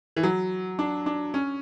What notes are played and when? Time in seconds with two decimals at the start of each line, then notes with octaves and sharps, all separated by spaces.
0.16 E3
0.23 F#3
0.79 D4
1.06 D4
1.34 C#4